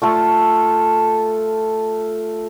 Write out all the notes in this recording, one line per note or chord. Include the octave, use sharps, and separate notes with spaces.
A3 F4 A4